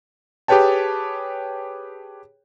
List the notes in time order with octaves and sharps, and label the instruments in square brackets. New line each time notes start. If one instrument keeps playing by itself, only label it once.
[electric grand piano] G4 G#4 B4 C#5 G5 A5